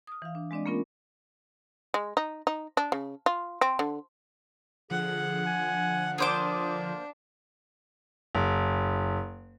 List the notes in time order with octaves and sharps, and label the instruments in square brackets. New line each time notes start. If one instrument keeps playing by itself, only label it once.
[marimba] D#6 F6
E3 F5
D4
G#3 C4 D4 D5 D#5
A#3 B3 C#4 F4 A#4
[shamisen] G#3
D#4
D#4
D4
C#3
F4
C4
D3
[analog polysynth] D3 F3 [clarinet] G#4 [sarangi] F#5
[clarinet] G#5
[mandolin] A#3 C5 D6 [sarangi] D4 [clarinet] D#6
[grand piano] F#1